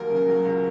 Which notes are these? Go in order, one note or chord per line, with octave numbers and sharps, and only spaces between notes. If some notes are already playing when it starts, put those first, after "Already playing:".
Already playing: D#2 F#3 A#4
C#3
F#3
C#2